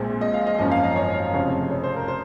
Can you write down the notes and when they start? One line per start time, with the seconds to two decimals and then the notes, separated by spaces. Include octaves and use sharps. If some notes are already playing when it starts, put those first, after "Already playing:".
Already playing: A#1 A#2 G#3 C4
0.21 D#5
0.34 F5
0.47 D#5
0.59 G#1 F#2 F3 A#3 C#4 D#5
0.71 F5
0.84 D#5
0.96 C#5
1.33 F1 F2 C#3 F3 C#5
1.71 C#5
1.84 C5
1.96 A#4
2.08 C5